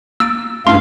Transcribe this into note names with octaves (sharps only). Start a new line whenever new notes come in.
A#3 E6 A6 D7
G2 A3 C#4 E4 F5 C6